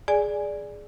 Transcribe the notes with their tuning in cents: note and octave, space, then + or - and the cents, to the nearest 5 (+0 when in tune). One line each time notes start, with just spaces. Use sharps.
G#4 +0 D5 +0 G#5 +0